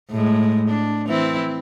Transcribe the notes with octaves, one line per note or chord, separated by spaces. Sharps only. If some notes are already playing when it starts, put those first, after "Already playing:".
A2 G#3
D4
E3 C4 E4